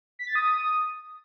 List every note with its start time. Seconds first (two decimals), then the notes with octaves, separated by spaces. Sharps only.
0.19 B6
0.27 A6
0.35 D#6